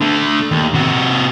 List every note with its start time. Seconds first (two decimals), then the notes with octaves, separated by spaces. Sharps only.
0.01 D3 A3
0.51 D#2
0.74 C3 F#4